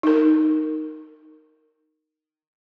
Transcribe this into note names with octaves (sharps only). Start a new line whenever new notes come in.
D#4 A#4